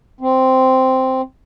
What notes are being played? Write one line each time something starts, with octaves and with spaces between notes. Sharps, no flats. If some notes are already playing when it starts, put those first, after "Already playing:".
C4